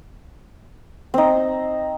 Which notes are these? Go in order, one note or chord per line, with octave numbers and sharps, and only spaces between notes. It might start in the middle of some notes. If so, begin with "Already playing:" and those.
C4 D#4